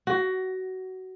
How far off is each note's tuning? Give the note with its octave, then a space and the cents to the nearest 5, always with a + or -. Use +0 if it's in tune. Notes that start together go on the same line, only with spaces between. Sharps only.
F#4 +20